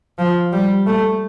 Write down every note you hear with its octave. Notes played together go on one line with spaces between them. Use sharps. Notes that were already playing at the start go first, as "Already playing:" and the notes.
F3
G3
A3